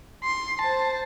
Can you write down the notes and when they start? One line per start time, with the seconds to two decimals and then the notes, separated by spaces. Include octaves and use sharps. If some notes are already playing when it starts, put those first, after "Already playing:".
0.24 C6
0.61 C5 A5